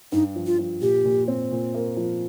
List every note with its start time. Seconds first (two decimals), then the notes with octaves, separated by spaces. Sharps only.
0.12 G2 D#4
0.35 F3
0.46 F4
0.58 F3
0.82 A#2 G4
1.05 A#2
1.28 C4
1.52 A#2
1.74 A#3
1.97 F3